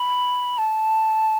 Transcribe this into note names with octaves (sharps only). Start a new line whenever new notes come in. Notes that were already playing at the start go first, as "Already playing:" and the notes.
Already playing: B5
A5